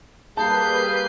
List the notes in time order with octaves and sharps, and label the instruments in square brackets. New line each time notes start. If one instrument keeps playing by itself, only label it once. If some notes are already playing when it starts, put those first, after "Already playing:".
[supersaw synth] G3 A#3 B4 [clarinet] G#4 [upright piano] A5 [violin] G6 C7